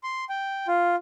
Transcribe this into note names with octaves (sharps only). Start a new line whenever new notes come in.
C6
G5
F4